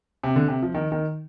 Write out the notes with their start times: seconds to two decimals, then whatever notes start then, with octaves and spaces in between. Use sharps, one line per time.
0.23 C3
0.36 D3
0.48 C3
0.62 F3
0.75 D#3
0.92 D#3